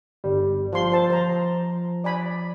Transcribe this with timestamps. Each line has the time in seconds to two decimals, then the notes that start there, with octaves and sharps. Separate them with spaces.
0.24 G1 G3
0.73 F3 F4 C6
0.92 C5 A5
1.10 C5 A#5
2.04 D5 G#5 B5